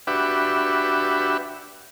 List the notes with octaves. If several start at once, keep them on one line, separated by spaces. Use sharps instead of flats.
D4 F#4 G4 B4 E5